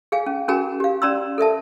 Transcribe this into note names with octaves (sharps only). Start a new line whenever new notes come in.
G#4 F5 G#5
C#4
C#4 F#4 G#4 A#4 G#5 A#5
G4 F5
C#4 D5 A#5 C6 E6
A4 A#4 E5 A5